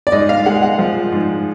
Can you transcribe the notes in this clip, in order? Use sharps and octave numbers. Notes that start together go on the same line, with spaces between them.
D5
G#2 D#5
F5
G#3 F#5
F#5
F3
G#2